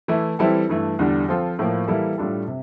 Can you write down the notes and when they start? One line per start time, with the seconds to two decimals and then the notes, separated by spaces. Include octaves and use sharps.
0.08 E3 A3 E4
0.39 E3 G3 C4 E4 A4
0.69 G2 E3 A3
0.99 E2 D3 G3 D4
1.28 F3 C4 F4 A4
1.59 A2 F3 A#3
1.88 E3 G3 A#3 E4 A4
2.18 A2 G3 D4 F4 A4
2.48 C3